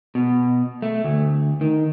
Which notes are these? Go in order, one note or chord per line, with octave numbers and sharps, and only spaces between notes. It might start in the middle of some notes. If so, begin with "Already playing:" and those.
B2
A3
D2
D#3